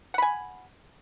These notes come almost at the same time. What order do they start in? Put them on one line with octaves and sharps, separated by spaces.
F#5 B5 G#5